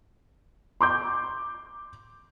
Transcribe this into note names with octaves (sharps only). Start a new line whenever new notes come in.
C6 D6 G6